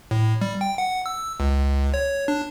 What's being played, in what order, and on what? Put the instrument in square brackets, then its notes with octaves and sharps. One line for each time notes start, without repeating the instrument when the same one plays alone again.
[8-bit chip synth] A2
G3
G5
F#5
E6
C#2
C#5
D4